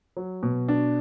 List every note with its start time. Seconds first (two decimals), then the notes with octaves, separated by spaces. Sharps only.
0.17 F#3
0.43 B2
0.68 D4